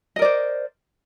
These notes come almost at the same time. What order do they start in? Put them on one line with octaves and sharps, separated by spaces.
D#5 A#4 D5 C5